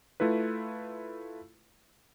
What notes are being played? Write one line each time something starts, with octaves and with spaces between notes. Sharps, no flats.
A3 E4 F4 B4